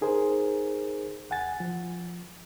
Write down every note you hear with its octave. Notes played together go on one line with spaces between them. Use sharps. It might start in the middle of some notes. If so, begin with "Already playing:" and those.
D#4 G#4 A#4 C5
D#2 F#5 G#5 A6
F3